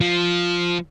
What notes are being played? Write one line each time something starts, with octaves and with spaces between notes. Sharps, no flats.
F3